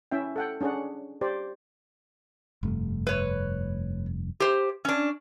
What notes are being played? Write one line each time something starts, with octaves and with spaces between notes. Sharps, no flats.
C#4 E4 E5 G5
A4 F#5 G5
C#4 D4 G#4 C#5 F#5
G4 C5 D5
F1 G2 A3
B4 C#5
G4 C5
C#4 D4